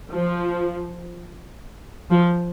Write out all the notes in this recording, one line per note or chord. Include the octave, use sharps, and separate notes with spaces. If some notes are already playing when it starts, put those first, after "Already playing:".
F3
F3